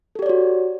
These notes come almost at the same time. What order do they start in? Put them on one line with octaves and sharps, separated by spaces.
A4 G4 D5 C#5 F#4